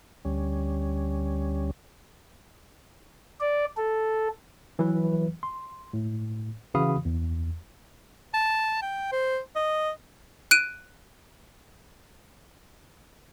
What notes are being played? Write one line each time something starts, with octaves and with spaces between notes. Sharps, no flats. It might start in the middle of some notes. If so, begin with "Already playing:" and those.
D2 G3 C#4
D5
A4
E3 F#3 B4
C6
A2
C#3 E3 F#4 F5 B5 D#6
E2
A5
G5
C5
D#5
F#6 D7 D#7